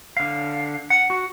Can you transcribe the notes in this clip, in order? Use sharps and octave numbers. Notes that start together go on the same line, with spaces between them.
D3 F5
F#5
F#4